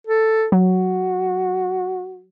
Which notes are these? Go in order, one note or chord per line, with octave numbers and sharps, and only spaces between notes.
A4
F#3 F#4